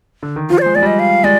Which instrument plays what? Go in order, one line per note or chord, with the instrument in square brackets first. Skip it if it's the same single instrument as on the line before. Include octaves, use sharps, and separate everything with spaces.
[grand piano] D3
D#3
[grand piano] F3 [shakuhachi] F4
[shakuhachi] D5
[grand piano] G#3 [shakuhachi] C5
[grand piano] G#3 [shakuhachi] D5
[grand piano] G3 [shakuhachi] D#5
[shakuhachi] F5
[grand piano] G#3 [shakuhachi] D5